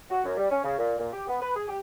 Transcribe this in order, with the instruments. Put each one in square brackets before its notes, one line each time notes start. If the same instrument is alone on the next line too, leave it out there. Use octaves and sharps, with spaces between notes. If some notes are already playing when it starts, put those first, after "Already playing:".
[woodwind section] F#4
F#2
G3
C#4
C#3
A#2
A#2
G4
B3
B4
G#4
G4